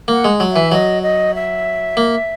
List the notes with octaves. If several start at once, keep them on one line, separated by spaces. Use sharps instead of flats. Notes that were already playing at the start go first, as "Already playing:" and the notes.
A#3 F#5
G#3
F#3
E3 E5
F#3 D#5
D#5
E5
A#3